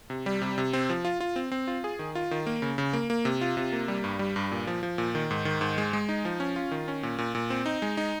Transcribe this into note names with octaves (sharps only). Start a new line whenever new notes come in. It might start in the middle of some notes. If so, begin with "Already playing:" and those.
C3
G3
C3
C3
C4
F3
F4
F4
C4
C4
F4
G#4
D#3
F4
D#3
A#3
C#3
C#3
A#3
A#3
C3
F4
C3
A#3
G3
G2
G3
G2
A#2
F3
F3
A#2
D#3
G#2
D#3
G#2
G#3
G#3
D#4
F3
C#4
F4
D#3
C#4
A#2
A#2
A#2
C4
D#4
G#3
D#4